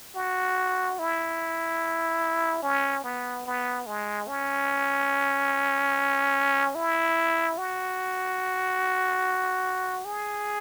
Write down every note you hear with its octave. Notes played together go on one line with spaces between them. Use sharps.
F#4
E4
C#4
B3
B3
G#3
C#4
E4
F#4
G#4